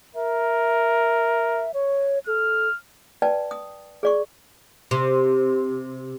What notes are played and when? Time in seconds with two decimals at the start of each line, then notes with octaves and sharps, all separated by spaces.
0.15 A#4 E5
1.74 C#5
2.27 A4 F6
3.22 B4 D5 G5 A5
3.51 D#6
4.03 G#4 D5 C#6
4.91 C3